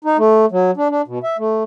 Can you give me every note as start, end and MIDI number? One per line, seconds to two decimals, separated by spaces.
0.04 0.17 63
0.18 0.45 57
0.51 0.71 54
0.77 0.88 62
0.90 1.02 62
1.08 1.19 47
1.23 1.37 76
1.38 1.63 57